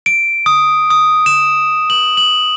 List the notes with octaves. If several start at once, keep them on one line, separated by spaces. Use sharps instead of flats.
D7
D#6
D#6
E7
F#7
F#7